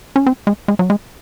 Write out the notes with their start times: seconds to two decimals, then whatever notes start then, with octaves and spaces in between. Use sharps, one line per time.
0.16 C#4
0.26 C4
0.47 G#3
0.68 G#3
0.79 F#3
0.90 G#3